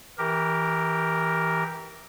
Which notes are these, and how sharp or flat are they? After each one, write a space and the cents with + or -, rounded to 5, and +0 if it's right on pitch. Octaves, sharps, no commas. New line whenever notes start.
E3 -20 G4 +0 A#4 +0